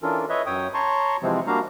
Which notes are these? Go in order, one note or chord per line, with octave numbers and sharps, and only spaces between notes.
E3 C#4 D4 F4 A4 A#4
B4 C#5 D#5 E5
F#2 C#5 G5 D#6
C#5 A5 A#5 C6 C#6
C3 E3 F3 G#3 C4
G3 A#3 D4 F#4 F5 A#5